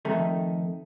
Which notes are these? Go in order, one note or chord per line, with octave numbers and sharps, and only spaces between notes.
F2 D#3 A3 D#4